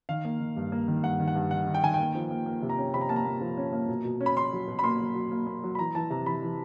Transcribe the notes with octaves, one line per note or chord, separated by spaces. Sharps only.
D#3 F5
A#3
D#3
G2
A#3
D#3
G2 F#5
D#3
F#5
G2
D#3 F#5
D#3
G5
D#3 G#5
A#3 G5
F3
A#3
A#3
C3
A#5
C#4
C3 B5
A#5
A#3 A5
A#5
A#3
F3
C#4
A#3
B2
B2
C#4
B5
C#4 C6
F#3
B2
B5
A#3 C6
F#3
F#3
A#3
A#3
F#3
B5
E3 A#5
E3 A5
C3 A#5
E3 B5
E3